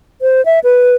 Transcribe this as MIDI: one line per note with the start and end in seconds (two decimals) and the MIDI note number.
0.22 0.44 72
0.46 0.59 76
0.64 0.96 71